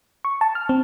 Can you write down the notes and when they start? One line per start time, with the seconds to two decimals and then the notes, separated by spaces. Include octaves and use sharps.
0.25 C#6
0.41 A5
0.55 F6
0.69 C4